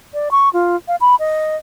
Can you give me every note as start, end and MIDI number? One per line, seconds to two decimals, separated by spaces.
0.14 0.29 74
0.31 0.49 85
0.53 0.76 65
0.88 0.96 77
1.01 1.15 83
1.19 1.56 75